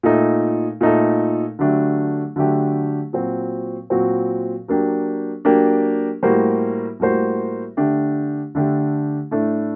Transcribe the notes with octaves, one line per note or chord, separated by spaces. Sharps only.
A#2 A3 D#4 A4
A#2 A3 D#4 A4
D3 F#3 A3 D4 G4
D3 F#3 A3 D4 G4
A#2 F#3 C4 F#4
A#2 F#3 C4 F#4
F#3 A#3 D4 G4
F#3 A#3 D4 G4
A2 G3 A#3 F#4 C5
A2 G3 A#3 F#4 C5
D3 A3 D4 G4
D3 A3 D4 G4
A2 A3 D4 A4